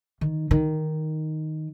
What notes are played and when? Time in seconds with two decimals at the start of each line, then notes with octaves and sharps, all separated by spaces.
0.21 D#3
0.51 D#3